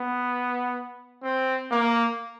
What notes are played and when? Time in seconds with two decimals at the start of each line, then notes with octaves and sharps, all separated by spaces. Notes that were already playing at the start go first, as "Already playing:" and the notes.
Already playing: B3
1.23 C4
1.71 A#3